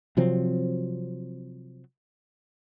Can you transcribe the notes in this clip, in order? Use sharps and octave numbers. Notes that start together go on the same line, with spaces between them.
C3 F3 F#3 C4